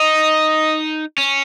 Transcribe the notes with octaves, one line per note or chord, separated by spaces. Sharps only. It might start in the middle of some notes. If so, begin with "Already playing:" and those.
Already playing: D#4 D#5
C#4